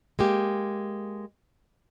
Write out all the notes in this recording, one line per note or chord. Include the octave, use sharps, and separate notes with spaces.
G#3 A#3 G4